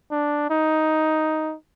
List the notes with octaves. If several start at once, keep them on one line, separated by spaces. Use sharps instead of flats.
D4
D#4